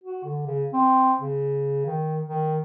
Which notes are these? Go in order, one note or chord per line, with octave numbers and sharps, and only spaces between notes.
F#4
D3
C#3
C4
C#3
D#3
D#3